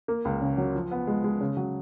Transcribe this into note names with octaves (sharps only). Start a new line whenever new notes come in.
A#3
C#2
C#3
F#3
F3
B3
G#3
G#3
C#3
F#3